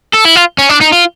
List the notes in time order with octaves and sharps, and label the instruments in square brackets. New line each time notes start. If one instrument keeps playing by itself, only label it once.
[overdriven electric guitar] A4
E4
F4
C#4
D4
D#4
F4